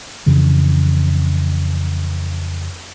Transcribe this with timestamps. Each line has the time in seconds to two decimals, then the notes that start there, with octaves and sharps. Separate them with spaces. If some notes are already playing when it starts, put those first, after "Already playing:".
0.26 F2 C#3 E3